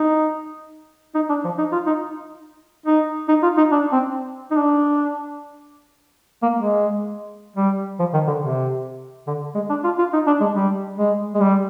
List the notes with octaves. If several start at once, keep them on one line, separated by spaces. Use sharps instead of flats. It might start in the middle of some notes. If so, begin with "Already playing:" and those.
Already playing: D#4
D#4
D4
F3
D#4
F4
D#4
D#4
D#4
F4
D#4
D4
C4
D#4
D4
A#3
G#3
G3
F3
D#3
D3
C3
D3
G#3
D4
F4
F4
D#4
D4
G#3
G3
G#3
G#3
G3